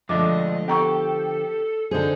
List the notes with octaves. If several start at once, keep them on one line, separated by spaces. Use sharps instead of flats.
D3 F3 G#3 A3 D4 D#5 D6
B3 G4 A4 A#5 C#6
D3 D#4 G#4 C5